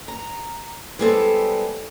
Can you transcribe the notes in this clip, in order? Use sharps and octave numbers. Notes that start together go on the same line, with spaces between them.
A#5
G3 G#3 B3 C4 E4 A4